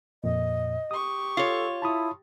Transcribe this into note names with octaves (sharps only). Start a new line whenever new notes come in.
F2 A#2 D#5
G4 C#6 D#6
F4 A4 C#5
E4 A5 B5 D#6